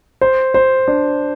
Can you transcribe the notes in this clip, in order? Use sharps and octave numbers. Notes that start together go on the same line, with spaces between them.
C5
C5
D4